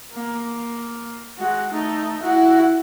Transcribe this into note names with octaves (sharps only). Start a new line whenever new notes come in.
A#3
G#3 F#4
A3 D#4
E4 F#4